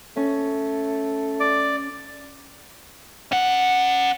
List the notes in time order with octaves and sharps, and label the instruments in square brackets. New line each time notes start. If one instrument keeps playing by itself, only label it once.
[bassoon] A3 [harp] C#4
[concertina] D5
[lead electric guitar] C#4 F#5